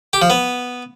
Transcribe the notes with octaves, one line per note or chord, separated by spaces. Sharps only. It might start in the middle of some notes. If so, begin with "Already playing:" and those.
G4
F3
B3